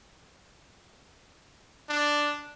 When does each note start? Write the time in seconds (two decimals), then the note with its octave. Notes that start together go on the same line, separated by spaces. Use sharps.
1.89 D4